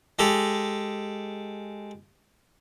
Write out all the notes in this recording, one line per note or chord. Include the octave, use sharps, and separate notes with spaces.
G#3 G4 A4